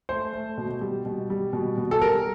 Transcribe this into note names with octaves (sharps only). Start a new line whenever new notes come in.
A3 C5
A3
B2
G3
B2
G3
B2
B2
A4
G3 A#4